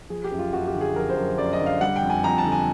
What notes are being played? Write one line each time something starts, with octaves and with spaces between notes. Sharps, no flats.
F3 G#4
G4
F#2
F4
F#2 F#4
G4
D3
G#4
F3 A#4
C5
F#2
F#2 D5
D#5
D3
F5
G3 F#5
G5
F2
G#5
F2 A#5
A5
D3
G#5